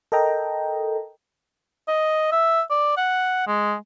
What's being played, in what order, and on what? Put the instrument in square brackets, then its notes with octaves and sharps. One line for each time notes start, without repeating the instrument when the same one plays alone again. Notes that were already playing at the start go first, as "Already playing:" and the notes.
[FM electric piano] A4 A#4 D#5 G5 A#5
[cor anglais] D#5
E5
D5
F#5
G#3